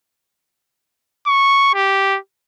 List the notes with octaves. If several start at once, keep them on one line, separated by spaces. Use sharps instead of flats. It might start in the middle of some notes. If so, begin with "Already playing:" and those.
C#6
G4